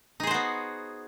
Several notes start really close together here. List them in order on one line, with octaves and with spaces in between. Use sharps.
D#4 G#4 C5 F#4 B3